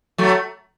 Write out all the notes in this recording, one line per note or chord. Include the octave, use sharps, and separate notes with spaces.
F#3 A3